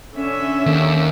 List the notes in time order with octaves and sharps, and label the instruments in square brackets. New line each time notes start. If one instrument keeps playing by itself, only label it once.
[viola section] D3 C#4 E5
[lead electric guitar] D#2